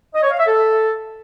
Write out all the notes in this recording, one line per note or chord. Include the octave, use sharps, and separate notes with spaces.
D#5
C#5
F5
E5
A4